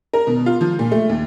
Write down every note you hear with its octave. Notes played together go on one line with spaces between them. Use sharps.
A#4
B2
F4
F3
A#2
A3
D#2